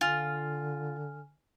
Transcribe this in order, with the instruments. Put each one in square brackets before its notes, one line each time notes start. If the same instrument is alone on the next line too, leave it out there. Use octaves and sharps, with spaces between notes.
[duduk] D3 [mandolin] F4 [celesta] G#5 F6